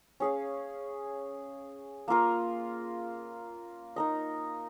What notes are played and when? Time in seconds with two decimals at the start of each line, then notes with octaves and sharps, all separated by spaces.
0.20 C#4 G#4 F5
2.08 A#3 F4 A#4
3.96 D#4 A#4 D#5